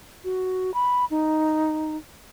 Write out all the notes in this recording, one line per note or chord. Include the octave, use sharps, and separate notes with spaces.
F#4
B5
D#4